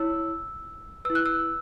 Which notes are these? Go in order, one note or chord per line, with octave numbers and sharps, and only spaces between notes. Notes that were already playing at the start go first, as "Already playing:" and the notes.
Already playing: E4 C#5 E6
E4 B4 E6
F#6
E6